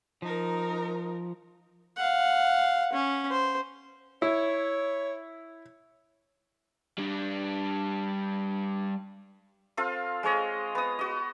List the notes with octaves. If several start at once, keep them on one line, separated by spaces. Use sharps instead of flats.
F3 D#4 A#4
F5 F#5
C#4
C5
E4 C#5
G3 D4
C4 F4 A4 F5
G#3 C4 C#5 D#5
B3 D#6
F#4 D#5